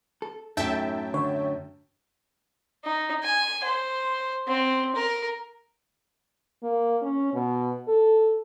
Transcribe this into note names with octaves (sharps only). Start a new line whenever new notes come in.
A4
F#2 A2 D#4 A4 E5 G5 A5
D3 C#5
D#4
G#5
C5
C4
A#4
A#3
C#4
B2
A4